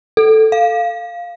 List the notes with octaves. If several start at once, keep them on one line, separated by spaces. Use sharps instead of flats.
A4
F5